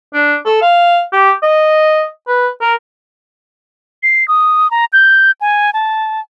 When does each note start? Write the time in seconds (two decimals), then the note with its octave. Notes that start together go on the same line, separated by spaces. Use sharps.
0.14 D4
0.46 A4
0.62 F5
1.13 G4
1.43 D#5
2.28 B4
2.62 A#4
4.03 C7
4.28 D#6
4.71 A#5
4.93 G6
5.41 G#5
5.74 A5